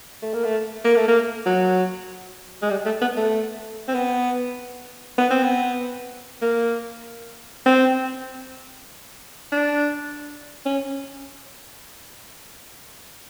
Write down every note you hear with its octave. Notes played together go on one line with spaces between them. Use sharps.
A3
A#3
A3
A#3
A3
A#3
F#3
G#3
G3
A3
B3
A3
C4
B3
B3
C4
B3
A#3
C4
D4
C#4